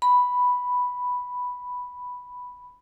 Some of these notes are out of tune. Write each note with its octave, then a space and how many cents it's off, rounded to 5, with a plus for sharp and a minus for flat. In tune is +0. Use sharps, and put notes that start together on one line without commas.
B5 +0